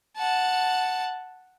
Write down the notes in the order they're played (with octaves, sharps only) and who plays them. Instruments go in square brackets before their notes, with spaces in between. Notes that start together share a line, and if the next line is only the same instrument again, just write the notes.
[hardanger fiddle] F#5 A5